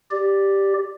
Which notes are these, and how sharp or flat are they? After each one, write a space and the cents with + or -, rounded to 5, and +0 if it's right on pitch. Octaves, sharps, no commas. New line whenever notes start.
G4 +0 D5 +0